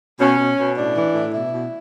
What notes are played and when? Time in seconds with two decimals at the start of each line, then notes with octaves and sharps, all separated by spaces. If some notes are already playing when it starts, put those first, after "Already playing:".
0.20 B2 C#4
0.39 B2
0.58 B2
0.77 A2 D4
0.96 E3
1.15 A2
1.33 B2 E4
1.52 B2